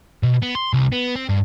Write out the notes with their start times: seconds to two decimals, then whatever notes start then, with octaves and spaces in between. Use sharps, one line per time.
0.23 B2
0.42 B3
0.55 C6
0.73 C2
0.92 B3
1.16 C4
1.29 G2